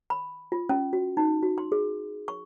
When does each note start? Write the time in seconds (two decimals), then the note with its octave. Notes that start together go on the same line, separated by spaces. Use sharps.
0.10 B5
0.52 F4
0.69 C#4
0.93 F#4
1.17 D#4
1.43 F#4
1.58 C6
1.72 G#4
2.28 C#6